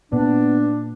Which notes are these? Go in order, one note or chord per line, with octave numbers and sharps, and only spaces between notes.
A#2 B3 D4